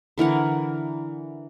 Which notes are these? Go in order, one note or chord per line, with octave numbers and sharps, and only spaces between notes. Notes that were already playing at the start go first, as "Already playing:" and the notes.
D3 E3 A#4 F#5